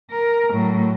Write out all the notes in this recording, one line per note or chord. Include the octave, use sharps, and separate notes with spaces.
A#4
A2 F#3